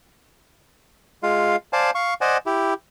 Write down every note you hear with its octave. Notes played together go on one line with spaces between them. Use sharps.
G#3 F4 F5
C5 D5 F5 G#5 A5
F5 C#6
C5 D5 D#5 F#5 G#5
E4 G4